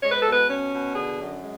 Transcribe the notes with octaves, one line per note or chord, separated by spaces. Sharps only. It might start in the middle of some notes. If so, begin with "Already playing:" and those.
G#3 C#5
B4
B2 A4
B4
C#4
B2
D3 G#4
F#2
G#3